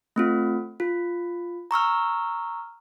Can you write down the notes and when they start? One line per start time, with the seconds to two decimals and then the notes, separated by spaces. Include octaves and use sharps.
0.16 A3 C4 F4
0.80 F4
1.71 A#5 C#6 E6 F6